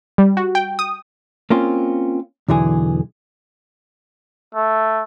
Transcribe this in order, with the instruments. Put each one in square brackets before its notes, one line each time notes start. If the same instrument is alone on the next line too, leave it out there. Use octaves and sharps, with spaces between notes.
[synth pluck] G3
F#4
G5
D#6
[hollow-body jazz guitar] A#3 C4 C#4 F4
B1 E2 D3 E3 G#4
[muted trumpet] A3